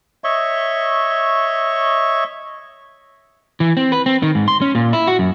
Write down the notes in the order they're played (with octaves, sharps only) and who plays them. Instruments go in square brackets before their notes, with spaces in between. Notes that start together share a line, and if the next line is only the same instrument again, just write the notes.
[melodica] C#5 D#5 E5 C#6
[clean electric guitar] E3
C4
B4
C4
D#3
G#2
C6
C#4
A#2
E4
F#4
F#2